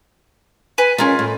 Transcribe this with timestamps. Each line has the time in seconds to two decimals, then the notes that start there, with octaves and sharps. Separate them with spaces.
0.78 B4 G#5
0.98 C#4 F4 G#4 A#4
1.19 A2